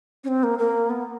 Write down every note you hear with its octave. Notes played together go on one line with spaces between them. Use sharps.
C#4
C4
A#3
A#3
B3